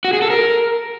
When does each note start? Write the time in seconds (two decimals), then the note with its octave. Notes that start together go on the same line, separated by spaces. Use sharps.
0.05 F#4
0.13 G#4
0.22 A4
0.30 A#4